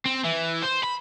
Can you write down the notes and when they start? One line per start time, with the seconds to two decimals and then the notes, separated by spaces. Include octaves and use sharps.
0.06 C4
0.25 E3
0.63 C5
0.84 B5